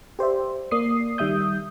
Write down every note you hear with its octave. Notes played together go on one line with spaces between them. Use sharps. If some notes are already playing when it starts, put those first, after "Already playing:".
G4 C5 D5 E5
A#3 D5 D#6 C7
D#3 G3 E5 D#6 G6